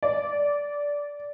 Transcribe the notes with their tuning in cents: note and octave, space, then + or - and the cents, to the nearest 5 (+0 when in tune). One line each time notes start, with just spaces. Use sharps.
D5 -15